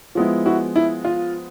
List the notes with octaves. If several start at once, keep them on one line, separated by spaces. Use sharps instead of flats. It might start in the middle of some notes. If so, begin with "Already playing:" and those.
F3 G#3 B3 E4
E4 F#4
E4
F4